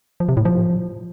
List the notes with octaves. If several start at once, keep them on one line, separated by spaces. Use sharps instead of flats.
F3
C3
A2
F3